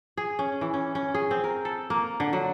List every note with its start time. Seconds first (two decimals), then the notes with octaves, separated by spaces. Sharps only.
0.17 G#4
0.39 C#4
0.61 E3
0.74 C#4
0.95 C#4
1.14 G#4
1.31 C4
1.44 A#4
1.65 A4
1.90 A#3
2.20 D3
2.33 F#3